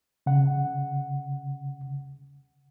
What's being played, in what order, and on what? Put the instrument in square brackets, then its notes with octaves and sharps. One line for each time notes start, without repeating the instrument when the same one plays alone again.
[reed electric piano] C#3 F#5